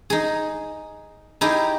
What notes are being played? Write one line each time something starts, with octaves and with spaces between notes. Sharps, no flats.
D#4 G#4
D#4 E4 G4 G#4